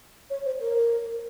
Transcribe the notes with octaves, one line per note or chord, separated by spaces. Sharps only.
C#5
C5
A#4